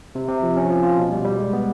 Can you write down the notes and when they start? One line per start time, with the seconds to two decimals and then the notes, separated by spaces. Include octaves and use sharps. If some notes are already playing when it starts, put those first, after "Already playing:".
0.15 C3
0.28 C3
0.43 F3
0.57 C#4
0.69 F3
0.83 F4
0.97 B2
1.12 G3
1.25 G3
1.39 G#3
1.53 B3